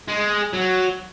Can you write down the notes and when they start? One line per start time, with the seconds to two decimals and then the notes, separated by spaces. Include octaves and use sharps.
0.08 G#3
0.53 F#3